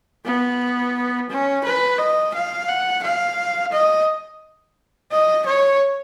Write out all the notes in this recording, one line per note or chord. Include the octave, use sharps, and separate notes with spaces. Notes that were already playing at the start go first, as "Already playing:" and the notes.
B3
C#4
B4
D#5
F5
F#5
F5
D#5
D#5
C#5